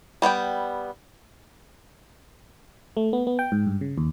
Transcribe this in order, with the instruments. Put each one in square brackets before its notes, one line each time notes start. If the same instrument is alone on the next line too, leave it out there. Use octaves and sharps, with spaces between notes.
[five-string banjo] G3 B3 F#5 G5
[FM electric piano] A3
B3
B3
G5
G#2
G2
C#3
D#2